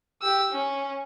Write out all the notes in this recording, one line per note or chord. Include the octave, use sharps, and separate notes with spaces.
G4 E6
C#4